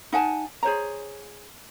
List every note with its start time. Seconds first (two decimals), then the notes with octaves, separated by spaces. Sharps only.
0.13 D#4 F#5 G#5 A5
0.63 G#4 C5 C#5 A#5